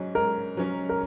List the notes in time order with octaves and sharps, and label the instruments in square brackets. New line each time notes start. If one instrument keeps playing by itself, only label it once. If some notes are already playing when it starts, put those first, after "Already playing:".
Already playing: [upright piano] G#2 F#3 C#4
[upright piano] G#2 [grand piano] A#4
[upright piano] F#3 C#4
[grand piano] A#4